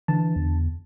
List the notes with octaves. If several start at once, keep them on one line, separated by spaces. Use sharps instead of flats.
D3 E3 A5
E2